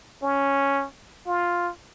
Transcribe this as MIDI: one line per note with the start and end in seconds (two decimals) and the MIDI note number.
0.22 0.85 61
1.27 1.70 65